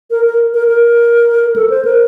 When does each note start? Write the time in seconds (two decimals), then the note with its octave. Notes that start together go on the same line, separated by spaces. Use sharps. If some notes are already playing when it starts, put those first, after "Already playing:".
0.11 A#4
0.26 A#4
0.54 A#4
0.68 A#4
1.56 A4
1.70 C5
1.85 A#4